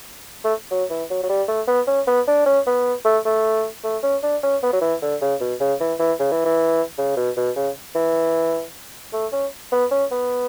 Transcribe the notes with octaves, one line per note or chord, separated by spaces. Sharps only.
A3
F#3
E3
F#3
F#3
G3
A3
B3
C#4
B3
D4
C#4
B3
A3
A3
A3
C#4
D4
C#4
B3
F#3
E3
D3
C#3
B2
C#3
E3
E3
C#3
E3
E3
C#3
B2
B2
C#3
E3
A3
C#4
B3
C#4
B3